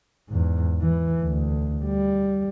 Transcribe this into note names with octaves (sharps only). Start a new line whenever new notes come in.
E2 G#2
E3
D2
G3